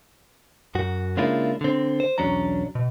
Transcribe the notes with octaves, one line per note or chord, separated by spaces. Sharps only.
F#2 F#4
C#3 G#3 A#3 D4 E4 F4
D3 C4
C5
B1 E2 F#3 C#4 D4 A#5
B2